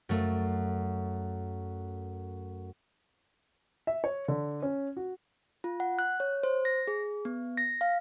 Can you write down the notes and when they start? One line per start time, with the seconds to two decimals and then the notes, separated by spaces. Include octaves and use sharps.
0.09 F#2 A3
3.87 E5
4.04 C#5
4.28 D3
4.62 C#4
4.97 F#4
5.64 F4
5.80 F#5
5.99 F#6
6.20 C#5
6.43 C5
6.65 A#6
6.88 G#4
7.25 B3
7.57 A#6
7.81 F5